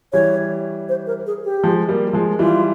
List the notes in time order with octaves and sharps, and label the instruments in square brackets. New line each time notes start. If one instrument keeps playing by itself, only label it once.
[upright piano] E3 G3 [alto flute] C#5
[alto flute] C5
A#4
G#4
G4
[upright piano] F3 G#3
G3 A#3
F3 G#3
[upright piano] E3 G3 [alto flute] F4